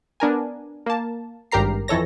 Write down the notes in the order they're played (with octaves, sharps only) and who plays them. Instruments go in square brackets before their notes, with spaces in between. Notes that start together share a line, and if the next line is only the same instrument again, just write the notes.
[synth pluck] B3 D4 A#4 G#5
A#3 A5
G#1 G2 G4 A#4 A#5 C7
F2 E3 A4 C#5 A#6